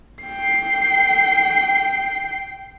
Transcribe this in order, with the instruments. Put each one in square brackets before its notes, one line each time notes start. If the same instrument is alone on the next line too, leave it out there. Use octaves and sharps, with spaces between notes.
[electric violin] G5 C7